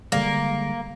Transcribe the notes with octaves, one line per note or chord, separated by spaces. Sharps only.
D3 G3 G#3 A#3